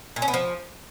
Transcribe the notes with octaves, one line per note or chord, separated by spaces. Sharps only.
A#2
C#4
B3
F3